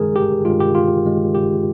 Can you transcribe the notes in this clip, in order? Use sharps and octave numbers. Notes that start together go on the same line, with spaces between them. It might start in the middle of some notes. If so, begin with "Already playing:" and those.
Already playing: G#1 G2 D#3 G#3 G#4 A#4
G#1 G4
G2 D#3 G#3 F4
G4
G#1 F4
G2 D#3 G#3
G#1 G4